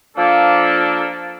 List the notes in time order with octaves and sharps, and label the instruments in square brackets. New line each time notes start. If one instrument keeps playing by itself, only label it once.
[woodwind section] F3 A#3 D4 A4